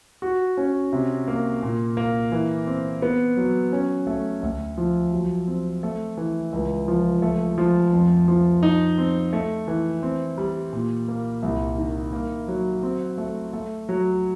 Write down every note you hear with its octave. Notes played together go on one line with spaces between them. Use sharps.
F#4
C#4
C3
A#3
A#2
A#3
E3
C4
B3
F#3
C#4
A3
D2
F3
F#3
C4
A3
E3
C#2
F3
A3
F3
F2
F3
D#4
C4
A3
E3
C4
G3
A#2
A#3
C2
D#3
A#3
F#3
C4
A3
A3
F#3